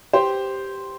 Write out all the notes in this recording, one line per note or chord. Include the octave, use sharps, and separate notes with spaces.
G4 C5